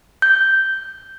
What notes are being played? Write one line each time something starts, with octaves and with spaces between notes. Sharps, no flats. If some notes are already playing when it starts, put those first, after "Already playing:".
G6